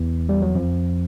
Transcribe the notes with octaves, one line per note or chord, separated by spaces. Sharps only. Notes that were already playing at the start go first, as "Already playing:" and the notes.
Already playing: E2 E3
G3
F#3
F2 F3